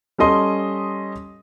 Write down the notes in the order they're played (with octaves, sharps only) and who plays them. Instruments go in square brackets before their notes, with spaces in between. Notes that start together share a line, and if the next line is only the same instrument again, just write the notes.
[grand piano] G3 C#4 A4 D#5 C6 D#6